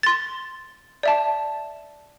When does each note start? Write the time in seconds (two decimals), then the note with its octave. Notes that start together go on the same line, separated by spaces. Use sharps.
0.03 C6 A6
1.03 D5 E5 A5